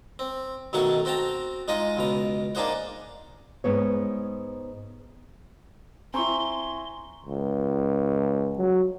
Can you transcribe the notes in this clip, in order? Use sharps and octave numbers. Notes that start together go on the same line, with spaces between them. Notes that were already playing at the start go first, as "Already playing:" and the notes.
C4
B1 D#3 F#3 A3 F#5 C#6
C4 F#4 G5 A5 A#5
G#3 D#4 F4 D#5
C#2 B2 A#5
A#3 D4 D#4 G#4 C5 F#5
G#2 B3 C#5
C4 E4 G#5 A#5 C6 C#6
C#2
F#3